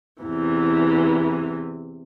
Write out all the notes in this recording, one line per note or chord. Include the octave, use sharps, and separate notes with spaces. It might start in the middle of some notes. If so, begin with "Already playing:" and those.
E2 C3 E3